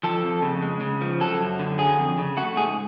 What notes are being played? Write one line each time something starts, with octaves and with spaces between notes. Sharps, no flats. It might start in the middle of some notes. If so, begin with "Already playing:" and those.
F3 A4
F2
C#3
G#3
C#3
F3
F#3 A4
F#2
D3
F#3 G#4
F2
C#3
A3 F#4
G#2 G#4